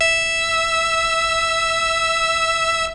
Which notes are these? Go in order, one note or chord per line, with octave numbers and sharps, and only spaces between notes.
E5 E6